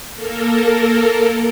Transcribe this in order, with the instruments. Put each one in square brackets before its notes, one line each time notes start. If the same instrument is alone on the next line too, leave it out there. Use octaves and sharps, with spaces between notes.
[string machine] A#3 A4 A#4